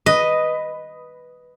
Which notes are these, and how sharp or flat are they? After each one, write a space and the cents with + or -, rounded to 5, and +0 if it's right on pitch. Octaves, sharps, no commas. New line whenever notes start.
B4 +0 D#5 +0